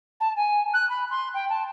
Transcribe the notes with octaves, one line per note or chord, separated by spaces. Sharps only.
A5
G#5
F#6
B5
C6
G5
A5